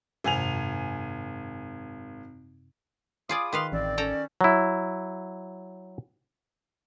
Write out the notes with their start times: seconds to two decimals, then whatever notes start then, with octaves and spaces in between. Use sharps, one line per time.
0.24 G#1 F#2 C3 G#5 F7
3.29 F4 G#4 D5 B5 D6 D#6
3.53 D#3 B4 F5 C6
3.72 A1 F#2 C4 D5
3.98 C#4 A4 G5 A#5
4.41 F#3 E4